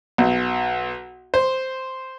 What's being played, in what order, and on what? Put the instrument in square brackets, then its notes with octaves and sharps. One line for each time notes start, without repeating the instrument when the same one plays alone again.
[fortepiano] B1
C5